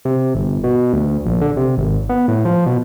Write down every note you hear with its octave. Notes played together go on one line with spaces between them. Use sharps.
C3
G1
B2
D2
A#1
D3
C3
G#1
B3
A2
F3
B2